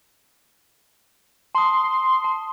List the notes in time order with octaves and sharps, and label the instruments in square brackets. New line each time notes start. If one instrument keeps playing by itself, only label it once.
[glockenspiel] A5 D#6 [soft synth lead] C6
[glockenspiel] A5